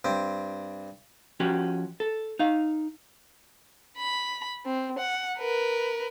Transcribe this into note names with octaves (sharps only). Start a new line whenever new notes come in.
G2 C4
F3 C#4 F#4 G4
A4
D#4 F5
B5
C4
F#5
A#4 B4